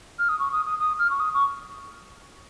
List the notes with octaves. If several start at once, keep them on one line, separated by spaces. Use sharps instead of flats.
F6
D#6
C#6
D#6
D#6
D#6
F6
C#6
D#6
C#6